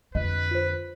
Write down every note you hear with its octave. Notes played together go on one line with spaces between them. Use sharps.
F2 D3 B4 D#5
F4 C5